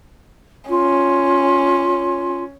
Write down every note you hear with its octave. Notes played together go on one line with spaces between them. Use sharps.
C#4 F4